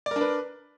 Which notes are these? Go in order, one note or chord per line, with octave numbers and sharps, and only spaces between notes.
D4 A#4 B4 D5